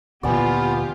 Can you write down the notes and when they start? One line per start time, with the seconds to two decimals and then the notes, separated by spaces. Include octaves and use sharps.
0.23 D2 A#2 E3 B3 F4 G4 D5 G#5